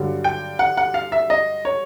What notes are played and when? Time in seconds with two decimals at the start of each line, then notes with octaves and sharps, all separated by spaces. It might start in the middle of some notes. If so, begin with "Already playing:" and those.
Already playing: G2 D3 F#3
0.24 G5
0.59 F#5
0.77 F#5
0.94 F5
1.12 E5
1.30 D#5
1.65 C#5